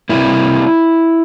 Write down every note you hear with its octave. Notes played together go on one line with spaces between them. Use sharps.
C3 G3 A#3 E4